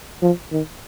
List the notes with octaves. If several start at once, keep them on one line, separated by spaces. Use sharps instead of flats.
F3
D#3